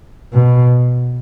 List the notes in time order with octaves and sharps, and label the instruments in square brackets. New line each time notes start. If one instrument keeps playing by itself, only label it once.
[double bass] B2